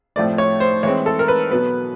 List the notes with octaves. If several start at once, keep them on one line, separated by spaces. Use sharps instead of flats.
A2 F3 A3 C4 D5
C#5
C5
E3 G#3 C4 C#5
A4
A#4
B4
B2 F#3 B3 B4